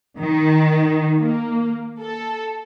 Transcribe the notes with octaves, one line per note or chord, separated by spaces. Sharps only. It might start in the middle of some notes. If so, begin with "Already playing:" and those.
D#3
A#3
A4